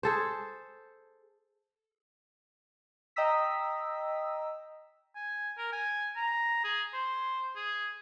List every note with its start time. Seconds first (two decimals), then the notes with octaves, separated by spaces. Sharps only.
0.03 G#4 A4 C5
3.16 D#5 G5 A#5 D#6 E6 B6
5.16 G#5
5.58 A#4
5.73 G#5
6.16 A#5
6.65 G#4
6.94 C5
7.56 G#4